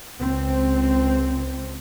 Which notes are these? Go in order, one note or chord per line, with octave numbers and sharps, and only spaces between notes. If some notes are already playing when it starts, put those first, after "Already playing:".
C#2 C4